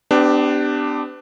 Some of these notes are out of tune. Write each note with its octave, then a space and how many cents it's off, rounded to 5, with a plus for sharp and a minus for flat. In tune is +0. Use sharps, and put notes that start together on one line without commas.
B3 +45 D4 +10 G4 +0